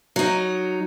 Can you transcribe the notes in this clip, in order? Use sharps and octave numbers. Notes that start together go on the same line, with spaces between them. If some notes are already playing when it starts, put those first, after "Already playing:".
F#3 D#4